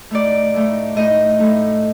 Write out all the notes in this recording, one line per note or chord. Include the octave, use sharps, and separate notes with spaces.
A2 A3 D#4 D5
A2 A3 D#4
A2 A3 D#4 D#5
A2 A3 D#4